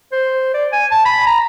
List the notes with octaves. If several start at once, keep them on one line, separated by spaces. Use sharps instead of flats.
C5
D5
G#5
A5
B5
A#5